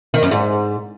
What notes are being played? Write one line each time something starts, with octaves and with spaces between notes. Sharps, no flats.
D#3
F#2
G#2